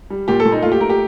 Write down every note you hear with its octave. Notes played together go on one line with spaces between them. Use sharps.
G3
A#2 G4
A4
A#2
D#4
A3 F4
G4
A3 A#4
G4